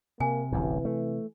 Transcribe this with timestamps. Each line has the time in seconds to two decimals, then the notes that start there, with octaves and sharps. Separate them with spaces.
0.20 C3 A#3 G#5
0.52 D1 A1 G2 E3
0.85 A3